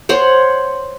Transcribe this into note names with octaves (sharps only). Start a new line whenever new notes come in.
C5 C#5 F#5 C6